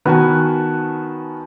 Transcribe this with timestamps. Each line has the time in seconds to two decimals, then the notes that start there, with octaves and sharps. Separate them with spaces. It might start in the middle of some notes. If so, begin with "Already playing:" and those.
0.05 D#3 B3 F#4 B4 G#5 A5